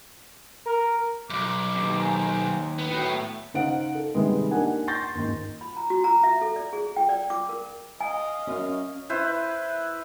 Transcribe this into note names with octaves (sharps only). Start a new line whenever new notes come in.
A#4
B1 F#2 D6
D#2
C5 G#5 A#5
B3
A2 F#3 G5
C#3 D#4 C5 F5 F#5 D7
A4
C3 D#3 G3 G#3 B3
A#3 D4 D#4 G4 F#5 G#5
C6 C#6 G6 A6 A#6
D#2 G#2
B5
A#5
F#4
A#5
E5
A4
D5
G#4
G5
D5
D6
A#4
D#5 F5 G#5
F#2 C#4 F6
E4 B4 C5